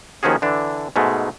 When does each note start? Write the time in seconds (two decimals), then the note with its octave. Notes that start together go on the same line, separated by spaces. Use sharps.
0.23 D#2 D#3 F3 C#4 F#4 G#4
0.42 D3 E3 D4
0.96 G#2 B2 G#3 A3